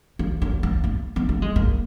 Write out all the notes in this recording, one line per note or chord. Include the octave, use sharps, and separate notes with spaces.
A#3
A#3
A#3
B3
B3
A#3
G#3
A#3